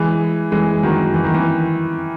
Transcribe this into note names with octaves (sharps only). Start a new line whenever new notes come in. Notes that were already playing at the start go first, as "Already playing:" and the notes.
Already playing: E3 G#3
E3 G#3
D#3 F#3
E3
D#3
E3